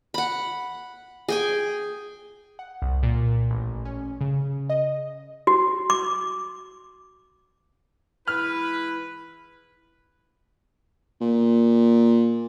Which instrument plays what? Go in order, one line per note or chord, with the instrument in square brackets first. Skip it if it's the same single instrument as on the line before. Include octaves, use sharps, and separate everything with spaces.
[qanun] F#5 B5
G#4 G5 G#5
[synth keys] F#5
C2
A#2
A1
C#4
C#3
D#5
[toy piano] F#4
D6
[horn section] G#2 E3 B4 [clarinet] E4 [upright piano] F6
[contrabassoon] A#2